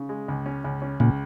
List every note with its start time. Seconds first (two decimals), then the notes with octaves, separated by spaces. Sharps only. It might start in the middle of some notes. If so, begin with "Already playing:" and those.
Already playing: C#3
0.09 G#3
0.28 C#2
0.46 C#4
0.64 C#2
0.82 C#4
1.00 C#2 A#2